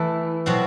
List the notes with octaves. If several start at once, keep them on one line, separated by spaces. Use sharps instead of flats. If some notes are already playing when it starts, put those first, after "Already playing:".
Already playing: E3 A3 E4
B2 F#3 C4 F#4